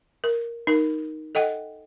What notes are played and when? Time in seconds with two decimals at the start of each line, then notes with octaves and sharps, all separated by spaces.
0.24 A#4
0.67 D#4 A#4
1.35 A4 D#5 F#5 G5